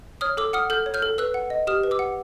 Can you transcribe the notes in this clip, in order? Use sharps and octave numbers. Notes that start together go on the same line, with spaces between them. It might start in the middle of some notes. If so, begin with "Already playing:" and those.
C#5 D#6 F6
A4 D6 E6
F#5 D#6 F6
A4 F6 G6
C#5
F6 G6
A4
B4 E6 F#6
F#5
D#5
G4 D#6 F6
B4
D6 E6
F#5